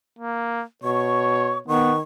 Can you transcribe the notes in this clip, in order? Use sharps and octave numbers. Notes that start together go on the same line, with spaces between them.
A#3
B2 C#5 C#6
D#3 B3 C#6